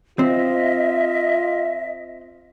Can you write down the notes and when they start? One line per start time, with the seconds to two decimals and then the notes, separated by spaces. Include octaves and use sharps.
0.19 C4 F4 D#5 E5